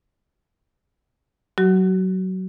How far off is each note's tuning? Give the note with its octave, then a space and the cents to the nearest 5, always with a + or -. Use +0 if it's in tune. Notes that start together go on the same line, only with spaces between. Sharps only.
F#3 +15 F#4 +30